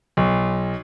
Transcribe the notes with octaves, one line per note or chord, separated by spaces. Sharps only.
B1